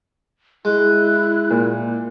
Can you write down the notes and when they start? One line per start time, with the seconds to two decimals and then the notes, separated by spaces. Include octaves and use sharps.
0.65 G#3 E4 F#6
1.51 A#2